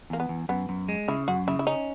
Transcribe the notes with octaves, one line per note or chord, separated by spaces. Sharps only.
E2 A#3
B3
E2
F#2 B3
F#2
G#3
C#3 E4
F#2 F#4
C#3 E4
E4
C#4 D#4